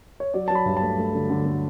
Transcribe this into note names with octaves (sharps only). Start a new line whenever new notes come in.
C#5
F#3 D5
F#3 A5
B5
G2
A3 A5
A3
D3
D3
A3